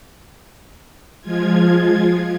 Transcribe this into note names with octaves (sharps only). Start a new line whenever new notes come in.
F3 G#3 F4 G#6